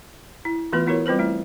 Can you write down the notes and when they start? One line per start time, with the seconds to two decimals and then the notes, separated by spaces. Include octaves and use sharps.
0.45 E4
0.72 E3 A3 B3 F4 B4
0.87 B3 E4 F#4 A#4 C#5
1.06 G3 C4 F4 B4 C5
1.19 A3 E4